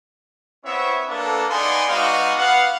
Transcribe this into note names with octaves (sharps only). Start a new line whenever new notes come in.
B3 C4 E4 C#5 E5
A#3 B3 D4 A4
B3 D#4 G#4 D5 G#5 C6
G#3 B3 D#4 F#4 D5 F5
B3 F5 F#5